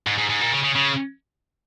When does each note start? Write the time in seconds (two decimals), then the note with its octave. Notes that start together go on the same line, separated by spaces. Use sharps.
0.07 G#2
0.18 G#2
0.30 G#2
0.41 A#2
0.52 C#3
0.64 C#3
0.75 C#3